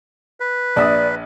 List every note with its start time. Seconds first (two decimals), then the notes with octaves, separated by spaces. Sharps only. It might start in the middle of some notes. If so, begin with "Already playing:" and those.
0.40 B4
0.76 A#1 D5 E5 D#6